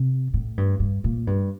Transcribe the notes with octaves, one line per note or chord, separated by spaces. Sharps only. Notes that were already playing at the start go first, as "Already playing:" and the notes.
Already playing: C3
A2
G2
G2
A#2
G2